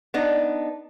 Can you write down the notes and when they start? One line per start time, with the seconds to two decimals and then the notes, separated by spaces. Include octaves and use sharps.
0.14 B3 D4 D#4